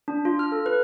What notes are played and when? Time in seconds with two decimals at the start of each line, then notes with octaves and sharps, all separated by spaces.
0.08 D4
0.25 F4
0.39 F6
0.52 A4
0.66 B4